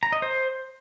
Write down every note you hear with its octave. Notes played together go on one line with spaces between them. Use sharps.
A#5
D#5
C5